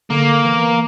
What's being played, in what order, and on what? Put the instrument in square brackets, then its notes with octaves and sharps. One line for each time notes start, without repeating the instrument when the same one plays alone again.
[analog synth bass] D3 [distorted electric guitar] A#3
[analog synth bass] E3